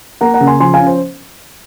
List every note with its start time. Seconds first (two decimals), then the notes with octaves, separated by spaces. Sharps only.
0.21 A#3 F#5 A#5
0.34 F#5 A#5
0.41 C#3
0.47 G#5 C6
0.60 F3 G#5 C6
0.74 F5 G#5
0.80 C#4
0.87 C5